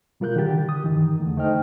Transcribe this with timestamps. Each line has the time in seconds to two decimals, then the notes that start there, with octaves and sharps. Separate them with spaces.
0.20 B2 G3 F4 A#4 F#6 G6
0.36 D3 D#3 G4 A6
0.69 D#6
0.84 G2 D#3 E3
1.20 E2 D3 A3
1.37 A3 D#4 C5 D#5 G5 F6